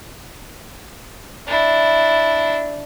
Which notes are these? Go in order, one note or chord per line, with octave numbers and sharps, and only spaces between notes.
D4 E4